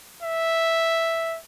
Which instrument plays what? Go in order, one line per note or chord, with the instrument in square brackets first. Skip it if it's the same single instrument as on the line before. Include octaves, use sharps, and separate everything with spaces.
[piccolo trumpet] E5